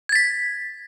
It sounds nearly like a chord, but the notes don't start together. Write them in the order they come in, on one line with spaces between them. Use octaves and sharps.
G#6 A6 B6